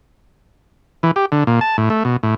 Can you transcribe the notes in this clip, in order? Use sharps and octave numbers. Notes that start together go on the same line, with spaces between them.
E3
G4
D3
A#2
A5
A2
A3
B2
A2